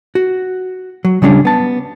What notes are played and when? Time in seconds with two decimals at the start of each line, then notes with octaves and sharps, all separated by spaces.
0.15 F#4
1.05 F#3
1.22 C#3 G3 C#4 D4
1.45 B3 A5